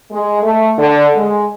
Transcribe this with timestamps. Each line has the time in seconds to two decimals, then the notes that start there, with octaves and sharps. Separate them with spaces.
0.12 G#3
0.43 A3
0.77 D3
1.16 G#3